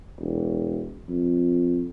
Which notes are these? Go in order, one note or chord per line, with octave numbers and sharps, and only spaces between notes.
E1
F2